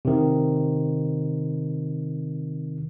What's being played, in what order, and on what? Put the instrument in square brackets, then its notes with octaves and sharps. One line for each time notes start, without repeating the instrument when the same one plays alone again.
[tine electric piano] C3 D#3